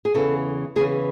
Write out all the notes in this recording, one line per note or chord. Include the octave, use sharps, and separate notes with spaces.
G#4
E2 C#3 E3 A4
E2 C#3 E3 G#4